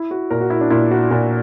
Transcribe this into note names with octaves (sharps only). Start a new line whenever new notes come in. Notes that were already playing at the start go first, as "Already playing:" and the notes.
Already playing: E4
F#4
A#2 A#4
F#4
E4
D4
A#2 E4
F#4
A#2 F#4